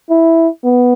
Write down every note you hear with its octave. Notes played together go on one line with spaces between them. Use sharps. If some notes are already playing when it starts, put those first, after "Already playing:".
E4
B3